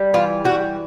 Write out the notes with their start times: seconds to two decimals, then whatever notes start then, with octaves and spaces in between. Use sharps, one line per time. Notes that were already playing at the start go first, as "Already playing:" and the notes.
Already playing: G3
0.14 E3 F4
0.45 G3 F#4